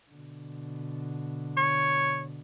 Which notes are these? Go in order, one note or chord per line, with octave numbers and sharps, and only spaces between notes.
B2 D3
C#5